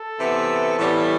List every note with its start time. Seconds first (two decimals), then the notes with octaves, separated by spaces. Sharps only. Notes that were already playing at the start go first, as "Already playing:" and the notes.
Already playing: A4
0.17 C3 E3 B3
0.77 A2 E3 G3 B3